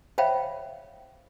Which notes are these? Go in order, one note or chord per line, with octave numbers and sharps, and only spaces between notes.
C5 C#5 E5 F5 G5 B5